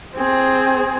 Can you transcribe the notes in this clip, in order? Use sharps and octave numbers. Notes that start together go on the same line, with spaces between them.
C4 G#4